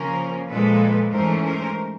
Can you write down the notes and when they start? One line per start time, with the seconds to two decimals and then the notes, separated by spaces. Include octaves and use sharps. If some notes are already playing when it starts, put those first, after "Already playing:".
Already playing: C#3 F3 A#3 C#4 A#4 C5
0.48 A#2 F3 G#3 A4 B4
1.11 G#2 E3 A3 C#4 A#4 C5
1.44 A#4 C5